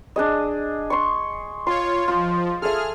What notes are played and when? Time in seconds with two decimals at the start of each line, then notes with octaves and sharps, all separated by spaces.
0.16 D4 G#4 D#5
0.90 C6 C#6
1.67 F4 C#5 C6
2.08 F3 F4
2.62 G#4 A4 E5 F6